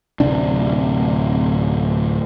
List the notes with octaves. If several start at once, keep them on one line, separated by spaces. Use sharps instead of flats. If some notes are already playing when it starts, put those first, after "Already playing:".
D1 C3 C4 D4